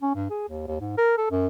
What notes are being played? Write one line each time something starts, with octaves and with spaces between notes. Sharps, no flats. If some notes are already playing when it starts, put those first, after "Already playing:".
C#4
G2
G#4
D#2
D#2
G#2
A#4
A4
F#2